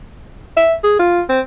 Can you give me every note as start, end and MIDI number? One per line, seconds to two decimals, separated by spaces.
0.57 0.74 76
0.84 0.96 68
0.99 1.21 65
1.29 1.40 60